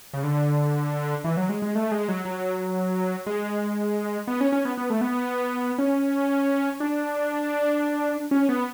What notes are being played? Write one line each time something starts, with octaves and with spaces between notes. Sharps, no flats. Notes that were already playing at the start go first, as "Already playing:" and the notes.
C#3
D3
E3
F#3
G#3
G#3
A3
G#3
F#3
F#3
G#3
B3
C#4
C#4
B3
B3
A3
B3
C#4
D4
C#4
B3